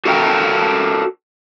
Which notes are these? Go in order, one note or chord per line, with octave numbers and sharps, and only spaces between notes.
F#4 A4 A#4 E5 G5